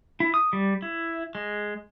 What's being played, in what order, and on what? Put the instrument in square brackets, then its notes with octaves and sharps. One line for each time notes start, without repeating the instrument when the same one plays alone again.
[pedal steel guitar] E4
D#6
G3
E4
G#3